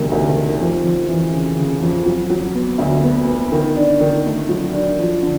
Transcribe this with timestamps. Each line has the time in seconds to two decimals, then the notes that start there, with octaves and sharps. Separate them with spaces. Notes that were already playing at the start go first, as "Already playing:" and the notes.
Already playing: E1 D2 C3 D#3
0.11 D2
0.35 D#3
0.60 F2
0.84 F2
1.09 E3
1.32 C#3
1.57 C#3
1.81 F2
2.06 F#3
2.30 F#3
2.54 B3
2.78 D2
3.03 B3
3.27 B3
3.52 D#3
3.76 D4
4.00 D#3
4.26 A3
4.49 F#3
4.73 D4
4.99 F3
5.23 D3